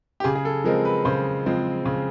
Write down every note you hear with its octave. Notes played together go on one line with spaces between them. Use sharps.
G4
C#3 G#4
G#4
A4
F3 G#3 C4 A#4
B4
C#3 C5
F3 G#3 C4
C#3